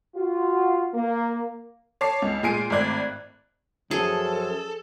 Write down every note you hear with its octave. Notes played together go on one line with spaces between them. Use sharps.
F4 F#4
A#3
C#5 A5 D6 C7
C#2
A#2 G#3 G#5 C7 D7 D#7
G#1 A2 C4 D5 F#6 G#6
F#2 F3 G#4 A4